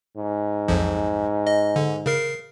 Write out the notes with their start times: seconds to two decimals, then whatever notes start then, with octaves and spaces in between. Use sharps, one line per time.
0.17 G#2
0.68 B1 F2 F3
1.47 D#5
1.76 D3
2.06 C#3 A#4 C7